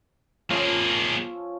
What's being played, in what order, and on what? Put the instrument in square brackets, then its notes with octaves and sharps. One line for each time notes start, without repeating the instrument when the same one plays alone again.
[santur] F3 C#4 E6 [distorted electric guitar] A#3 G#4